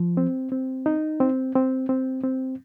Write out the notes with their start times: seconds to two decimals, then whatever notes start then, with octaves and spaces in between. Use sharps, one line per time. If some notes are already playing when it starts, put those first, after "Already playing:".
Already playing: F3
0.17 C4
0.52 C4
0.86 D#4
1.20 C4
1.55 C4
1.89 C4
2.24 C4